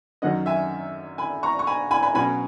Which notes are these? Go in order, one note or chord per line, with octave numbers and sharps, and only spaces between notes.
F#2 D#3 F#3 C#4 D#5 F#5
E5 G#5
G#5 B5
A#5 C#6
C#6
G#5 B5
G#5 B5
G#5 B5
B2 F#3 C#4 G#5 B5